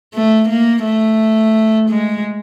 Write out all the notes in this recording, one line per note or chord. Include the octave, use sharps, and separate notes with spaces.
A3
A#3
A3
G#3